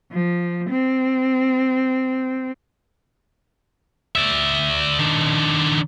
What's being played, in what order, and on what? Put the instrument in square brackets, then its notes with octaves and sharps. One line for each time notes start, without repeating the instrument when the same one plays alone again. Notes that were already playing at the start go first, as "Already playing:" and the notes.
[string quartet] F3
C4
[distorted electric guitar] D5 E5
D#3 D4